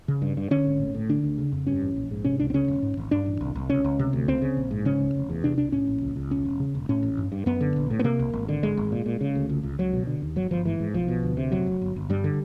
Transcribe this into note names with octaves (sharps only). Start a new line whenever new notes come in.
C#3
G2
G2
D3 C#4
G#1
A2
A2
D3 D4
D2
C#3
F2
G2 C#4
A1
A#1
G#2
C3 C#4
C#2 D4
C4
C#3 C#4
E1
G#2
G#1
G2 D4
A1
C2
C2
C#2 C#4
C#2
C3
D2
C#2 C4
C#3
A#1
G#2
C#3 C#4
C#2
F1
E2
C3 D4
C2 D4
A2 C#4
A#1
C#2
C#2
E1 C#4
E1
C#3
E1
A2 C#4
A1
G2
G2
F#2 B3
D3
A#1
A2
B3
C3 A#3
C2
G#1
D3
G#1 G#3
G#1
A#2
A#2
C#3
D2
C#2
C#2
C#2 F#3
B2
D3
D#2
G1 F#3
G1 F3
G#2 E3
G#2
B1 F3
B2
D2
C3
F1 F#3
F1
G1
G1
G2 G3
D3